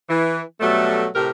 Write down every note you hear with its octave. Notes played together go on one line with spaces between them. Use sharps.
E3
B2 F#3 G3 A3
A2 C3 G4 A#4